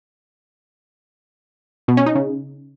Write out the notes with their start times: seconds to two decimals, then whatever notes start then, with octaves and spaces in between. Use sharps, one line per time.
1.88 B2
1.97 C#4
2.06 D#4
2.15 C#3